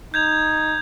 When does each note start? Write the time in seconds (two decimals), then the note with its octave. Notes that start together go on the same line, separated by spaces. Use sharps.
0.14 D#4 G6 G#6 F7